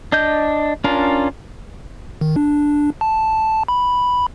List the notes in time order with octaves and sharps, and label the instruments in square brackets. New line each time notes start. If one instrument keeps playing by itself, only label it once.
[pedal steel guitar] D4 D#5 G6
C#4 D4 F4 A#4
[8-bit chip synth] D#3
D4
A5
B5